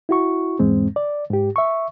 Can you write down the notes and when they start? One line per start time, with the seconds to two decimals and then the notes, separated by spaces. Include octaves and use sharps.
0.09 E4 F#4 C#6
0.59 E2 G#2 G#3 C4
0.96 D5
1.31 G#2 G4
1.56 E5 C#6